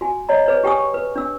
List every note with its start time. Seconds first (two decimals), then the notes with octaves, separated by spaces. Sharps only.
0.01 F#4 G#5
0.29 C#5 D#5 A#5
0.46 G#4 B4 C#5
0.64 G4 G5 G#5 C#6 D#6
0.94 B4
1.16 D4 E6